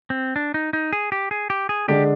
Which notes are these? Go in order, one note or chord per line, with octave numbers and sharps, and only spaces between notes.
C4
D4
D#4
D#4
G#4
G4
G#4
G4
G#4
D3 G#3 D4 G4